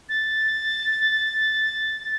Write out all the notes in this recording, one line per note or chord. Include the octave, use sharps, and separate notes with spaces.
A6